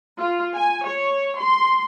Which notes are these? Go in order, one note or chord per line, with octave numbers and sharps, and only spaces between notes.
F4
G#5
C#5
C6